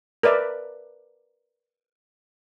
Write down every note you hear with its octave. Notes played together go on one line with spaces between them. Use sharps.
A#4 B4 D5 E5